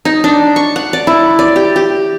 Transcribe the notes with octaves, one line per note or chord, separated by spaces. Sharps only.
D#4
D4
C#6
F#5
D5
E4
D5
G4
G4